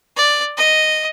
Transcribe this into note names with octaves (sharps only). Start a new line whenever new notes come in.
D5
D#5